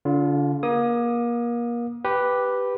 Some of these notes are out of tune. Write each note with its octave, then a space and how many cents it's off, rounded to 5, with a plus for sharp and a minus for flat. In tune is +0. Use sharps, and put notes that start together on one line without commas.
D3 -40 F4 +0
A#3 +30 D#6 +0
G4 +0 B4 +0